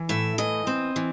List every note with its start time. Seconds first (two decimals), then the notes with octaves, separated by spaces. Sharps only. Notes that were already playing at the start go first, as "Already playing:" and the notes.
Already playing: E3
0.09 A2 E5
0.38 E3 D#5
0.67 C4
0.96 E3